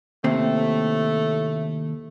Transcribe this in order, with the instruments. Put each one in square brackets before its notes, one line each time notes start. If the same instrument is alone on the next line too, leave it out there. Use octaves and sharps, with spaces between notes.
[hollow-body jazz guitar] D#2 C3 C4 [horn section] A2 A3